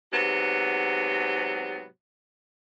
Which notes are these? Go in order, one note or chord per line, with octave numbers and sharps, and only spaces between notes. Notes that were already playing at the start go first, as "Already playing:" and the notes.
G#2 C3 F#3 B3